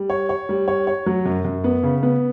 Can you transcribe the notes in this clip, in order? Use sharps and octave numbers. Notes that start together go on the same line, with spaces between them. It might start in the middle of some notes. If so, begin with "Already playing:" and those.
Already playing: G3
C#5
C#5
G3
C#5
C#5
F#3
F#2
F#2
B3
C#3
B3